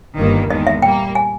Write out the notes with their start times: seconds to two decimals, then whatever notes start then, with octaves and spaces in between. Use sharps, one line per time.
0.16 G1 G2 D#3 G3 A#3
0.50 E2 D#3 G#3 D#5
0.67 E5
0.82 A#2 G3 A#3 G5
1.15 G#5